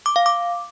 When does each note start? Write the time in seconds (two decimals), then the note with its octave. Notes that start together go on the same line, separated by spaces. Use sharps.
0.06 D6
0.16 F5
0.26 D6